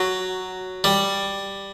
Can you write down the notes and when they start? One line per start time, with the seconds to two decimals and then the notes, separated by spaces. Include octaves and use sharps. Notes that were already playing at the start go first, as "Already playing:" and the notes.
Already playing: F#3
0.84 G3